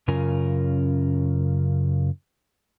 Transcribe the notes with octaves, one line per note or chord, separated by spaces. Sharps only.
F#2 C#3 C#4 F4 A#4 G#5